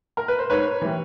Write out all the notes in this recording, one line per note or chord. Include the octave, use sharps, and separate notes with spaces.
A#4
B4
C5
G#2 B4 C#5
E3 G3